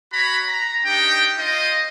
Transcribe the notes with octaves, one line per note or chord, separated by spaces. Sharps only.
F#4 C#5 A#5 B5
A#5
D4 D#4 G4 G5
F4 C5 D#5